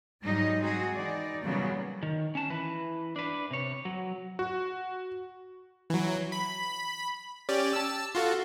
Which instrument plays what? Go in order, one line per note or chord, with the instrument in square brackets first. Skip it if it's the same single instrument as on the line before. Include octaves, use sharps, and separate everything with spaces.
[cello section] G#2 F#3 G3 D#4 D#5
C4 D#4 F#4 G#4
E3 D#4 D5
A#2 C#3 E3 F#3 G3 B3
[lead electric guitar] D#3
C#4 A5
E3 B4
D4 B4
C3 C#5
F#3
[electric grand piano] F#4
[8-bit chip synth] E3 F#3
B5
C#4 G4 D5
A5 E6
F4 F#4 A4